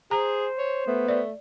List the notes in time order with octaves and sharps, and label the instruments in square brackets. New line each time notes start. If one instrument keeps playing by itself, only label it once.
[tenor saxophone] G#4 [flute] C5 [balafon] A#5
[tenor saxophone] C#5
[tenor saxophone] A3 [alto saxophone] B3
[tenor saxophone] A3 [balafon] D5